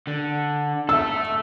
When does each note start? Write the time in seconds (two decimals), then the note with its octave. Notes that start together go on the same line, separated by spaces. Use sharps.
0.07 D3
0.89 A4 E5 E6